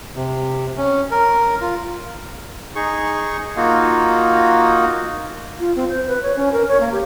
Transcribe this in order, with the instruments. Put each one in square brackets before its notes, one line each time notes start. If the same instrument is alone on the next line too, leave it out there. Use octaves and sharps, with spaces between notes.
[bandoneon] C3
C#4
A#4
F4
[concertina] D#4 G#4 C#6
A#3 D#4 F4 F#4
[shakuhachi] F4
C4
C5
B4
C#5
C#4
A#4
C#5
A#3
G4